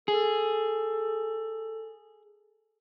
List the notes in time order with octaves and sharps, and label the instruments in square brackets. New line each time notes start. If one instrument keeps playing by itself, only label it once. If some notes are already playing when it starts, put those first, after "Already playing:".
[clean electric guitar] G#4 [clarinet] A4